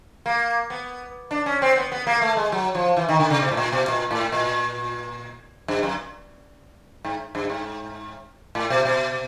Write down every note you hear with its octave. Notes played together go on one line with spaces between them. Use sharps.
A#3
B3
D4
C#4
C4
B3
B3
A#3
A3
G#3
F#3
F3
E3
D#3
D3
C#3
B2
A2
A#2
B2
A#2
A2
A#2
G2
F#2
G#2
G2
G#2
A2
B2
B2